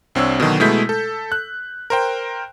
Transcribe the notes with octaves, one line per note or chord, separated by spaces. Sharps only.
C2 C4 D4 C#5 E6
B2 D3 D#3 F#3
B2 G#3 A3 E4 G6 B6
A4
F#6
A#4 C5 G5